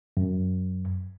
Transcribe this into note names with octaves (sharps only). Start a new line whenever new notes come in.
F#2